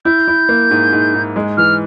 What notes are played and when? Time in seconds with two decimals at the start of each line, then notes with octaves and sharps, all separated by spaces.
0.05 E4 G6
0.28 E4
0.49 A#3
0.71 G#2
0.93 G#2
1.14 G#2
1.36 G#3
1.57 E3 F6